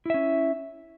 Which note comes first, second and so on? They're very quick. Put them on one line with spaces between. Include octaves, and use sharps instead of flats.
E4 E5 C#4